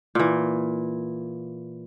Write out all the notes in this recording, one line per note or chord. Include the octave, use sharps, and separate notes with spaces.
A#2 E3